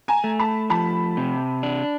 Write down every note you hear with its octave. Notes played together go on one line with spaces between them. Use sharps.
G#5 A#5
A3
A5 B5
F3 A5 B5
C3
D4